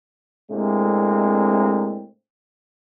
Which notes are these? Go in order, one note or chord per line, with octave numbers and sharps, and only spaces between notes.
A2 C3 G#3 A#3 C4 D4